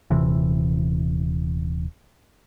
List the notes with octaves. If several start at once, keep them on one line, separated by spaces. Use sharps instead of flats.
D#1 C3 E3